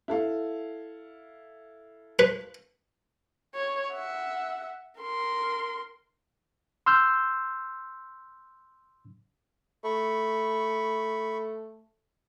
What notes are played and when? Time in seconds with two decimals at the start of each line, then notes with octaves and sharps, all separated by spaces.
0.08 E4 A4 F5
2.19 B4
3.55 C#5
3.93 E5 F#5
5.00 A#4 C6
6.86 C6 E6 F6 G6
9.84 A3 B5 C#6